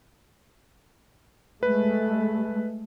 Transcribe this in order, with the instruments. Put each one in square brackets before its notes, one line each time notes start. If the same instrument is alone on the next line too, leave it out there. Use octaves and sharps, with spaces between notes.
[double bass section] G#3 A3 [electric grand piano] B4